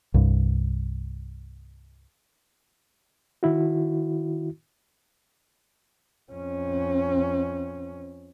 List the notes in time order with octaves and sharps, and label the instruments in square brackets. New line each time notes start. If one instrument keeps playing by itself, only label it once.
[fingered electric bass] C2 G2
[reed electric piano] D#3 E4 F#4
[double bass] F2 C#4